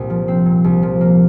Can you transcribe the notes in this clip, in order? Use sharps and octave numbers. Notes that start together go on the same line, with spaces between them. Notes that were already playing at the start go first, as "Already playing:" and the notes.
Already playing: C2 A#2 A#3 C4
F3
C4
A#2
C2
F3
A#3